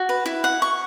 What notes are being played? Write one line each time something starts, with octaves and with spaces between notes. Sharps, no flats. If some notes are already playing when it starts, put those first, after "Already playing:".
Already playing: F#4
B4
E4
F#5
C#6